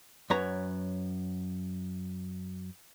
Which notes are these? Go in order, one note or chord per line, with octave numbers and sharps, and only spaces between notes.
F#2 B4 C#5 A#5